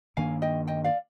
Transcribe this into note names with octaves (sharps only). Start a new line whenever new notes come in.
G2 D#3 A#3 D4 F5 G#5
D#5 G5
D#5 G5
D5 F5